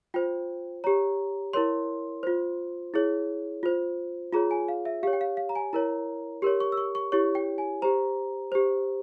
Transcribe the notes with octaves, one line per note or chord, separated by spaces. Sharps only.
F4 C5 G5
G4 C#5 A#5
E4 A#4 C#5 C6
F4 C5
E4 G#4 C#5
F4 C5
F4 G#4 C#5 A#5
G#5
F5
E5
G4 C#5 F5
G5
F5
F5
A#5
G#5
E4 A#4 C#5 A#5
G4 A#4 C#5 C6
C#6
E6
C#6
C#6
E4 G4 C#5 C#6
G5
G#5
G4 C5 A#5
G4 C5